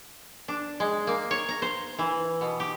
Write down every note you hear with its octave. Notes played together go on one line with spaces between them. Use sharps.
D4
G#3
A#3
C#5
A#5
C5
E3
B2
G4